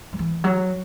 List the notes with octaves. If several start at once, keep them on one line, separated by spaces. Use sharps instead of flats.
F#3
E3
F#3